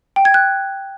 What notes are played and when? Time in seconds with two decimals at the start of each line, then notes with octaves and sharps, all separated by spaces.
0.16 G5
0.25 G#6
0.34 F#6